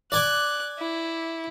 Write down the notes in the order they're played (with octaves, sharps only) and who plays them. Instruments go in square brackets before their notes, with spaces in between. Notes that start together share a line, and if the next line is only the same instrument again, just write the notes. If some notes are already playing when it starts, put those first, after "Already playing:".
[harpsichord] D5 G#5 D6 [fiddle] F#6
[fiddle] E4